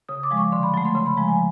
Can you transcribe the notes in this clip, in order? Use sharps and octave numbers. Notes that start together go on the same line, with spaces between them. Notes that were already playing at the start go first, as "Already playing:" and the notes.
C#3 D#6
D6
F3 G#3
C#6
D3 C6
B5
F#3 A3
C6
C#3 C6
B5
F3 G#3 A#5
G#5